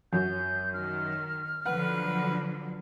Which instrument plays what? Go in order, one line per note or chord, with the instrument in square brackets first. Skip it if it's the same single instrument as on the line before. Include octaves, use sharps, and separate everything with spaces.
[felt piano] F#2 F#3 [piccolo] G6
[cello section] D#3 [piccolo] F6
[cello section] D3 F3 F#3 [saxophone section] B4 [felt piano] F#5